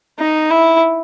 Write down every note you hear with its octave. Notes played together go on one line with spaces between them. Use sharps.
D#4
E4